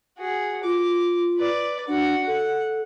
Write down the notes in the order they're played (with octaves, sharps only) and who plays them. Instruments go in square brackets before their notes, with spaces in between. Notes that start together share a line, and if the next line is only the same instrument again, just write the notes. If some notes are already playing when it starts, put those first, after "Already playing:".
[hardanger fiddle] F#4 G#4
[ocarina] F4 [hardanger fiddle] D6
[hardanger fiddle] B4 D5
[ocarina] D4 [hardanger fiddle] F#4
[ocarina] A4 [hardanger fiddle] F#5